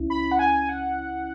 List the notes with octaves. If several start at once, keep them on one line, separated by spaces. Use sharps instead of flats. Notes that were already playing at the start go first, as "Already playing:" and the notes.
Already playing: C#2 C#4 E4
B5
F#5
G#5
F#5